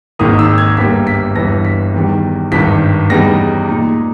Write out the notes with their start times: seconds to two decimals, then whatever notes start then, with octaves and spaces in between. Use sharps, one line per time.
0.19 G#1 G#2 D#3 A#3 D#6
0.39 E6
0.58 G#6
0.77 G1 G2 G3 A#3 B6
1.07 B6
1.35 G1 G2 E3 A#6
1.65 B6
1.94 E2 D#3 G3
2.52 G#1 G2 D#3 B6
3.10 E2 C#3 G3 B3 D#4 A#6
3.68 A#2 G#3 D#4